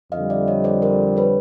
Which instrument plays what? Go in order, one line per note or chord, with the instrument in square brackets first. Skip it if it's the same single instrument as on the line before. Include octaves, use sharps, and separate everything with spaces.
[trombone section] F2 D3 G3 [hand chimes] D#5 F5
[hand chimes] D5 E5
C#5 D#5
C5 D5
A#4 C5
B4 C#5